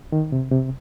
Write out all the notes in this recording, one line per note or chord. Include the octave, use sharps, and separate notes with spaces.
D#3
C3
C3